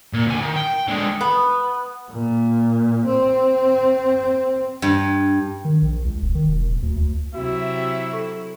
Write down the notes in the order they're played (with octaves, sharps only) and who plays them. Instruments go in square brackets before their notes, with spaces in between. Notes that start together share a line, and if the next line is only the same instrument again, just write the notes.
[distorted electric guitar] A#2
D2 G#5
D#3
G5
D3 G#3
[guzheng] B3
[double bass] A#2
C4
[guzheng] G2
[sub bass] D#3
A#1
C#2
D#1
D#3
E1
D1
D2
D2
[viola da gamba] C3 F#3 E4 [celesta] F#4 [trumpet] E5
[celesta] A4 C#6